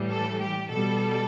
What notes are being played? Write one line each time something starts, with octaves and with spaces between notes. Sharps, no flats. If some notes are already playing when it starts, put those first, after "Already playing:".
Already playing: A2 E3 G3
A4
G4
B2 G3 A4